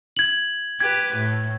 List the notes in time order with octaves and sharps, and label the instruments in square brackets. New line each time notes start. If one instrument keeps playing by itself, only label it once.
[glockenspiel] G#6 F#7
[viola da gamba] G4 B4 [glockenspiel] G#6
[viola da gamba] A2